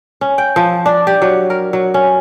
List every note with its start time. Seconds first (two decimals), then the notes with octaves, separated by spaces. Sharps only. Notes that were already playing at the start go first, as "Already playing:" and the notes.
0.21 C#4
0.38 G5
0.56 F3
0.86 D4
1.07 G4
1.22 F#3
1.50 A#4
1.73 F#3
1.94 C#4